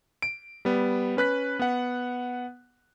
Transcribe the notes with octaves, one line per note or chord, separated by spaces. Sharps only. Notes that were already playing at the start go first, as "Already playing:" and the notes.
D7
G3 B3
C#4 B4 F#6 B6
B3 F#5